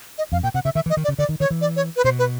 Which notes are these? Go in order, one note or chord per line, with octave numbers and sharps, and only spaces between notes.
D#5
F2 F5
A#2 G5
C3 F#5
C#3 E5
D#3 E5
E3
D#5
D#3
D5
C#3
D3 D5
D#3
D#3 C#5
E3
D5
C#5
B4
B2 C5
B4